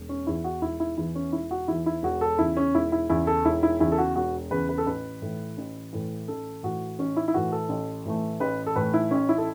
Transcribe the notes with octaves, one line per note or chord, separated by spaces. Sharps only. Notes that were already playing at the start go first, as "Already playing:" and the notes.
Already playing: E1
C#4
E2 E3 E4
F#4
E1 E4
E4
E2 E3 E4
C#4
E1 E4
F#4
E2 E3 E4
E4
E1 F#4
A4
E2 C#3 E4
C#4
E1 E4
E4
E2 C#3 E4
A4
E1 E4
E4
E2 C#3 E4
A4
F#4
E1 F#4
E2 C#3 B4
B4
A4
A1 B4
A2 E3
A1
A2 E3
A1 A4
A2 E3 F#4
A1 C#4
E4
E4
A2 E3 F#4
A4
A1
A2 E3 A3
A1 B4
A4
A2 E3 A3 B4
E4
A1 C#4
E4
A4